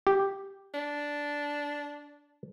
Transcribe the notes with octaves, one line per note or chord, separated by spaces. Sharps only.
G4
D4